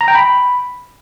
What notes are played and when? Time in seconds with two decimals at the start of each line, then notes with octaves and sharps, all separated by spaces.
0.01 A#5
0.08 G5
0.15 B5